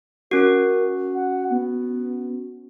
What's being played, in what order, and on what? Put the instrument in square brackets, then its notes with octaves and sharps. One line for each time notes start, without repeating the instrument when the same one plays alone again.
[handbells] C#4 F#4 [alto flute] A#4
[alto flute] F#5
B3